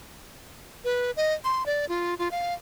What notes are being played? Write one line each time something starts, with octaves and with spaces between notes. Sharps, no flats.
B4
D#5
C6
D5
F4
F4
F5